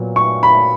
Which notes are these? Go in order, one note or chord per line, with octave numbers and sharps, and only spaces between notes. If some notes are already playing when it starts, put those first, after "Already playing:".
Already playing: A#2 F#3 B3
C#6
B5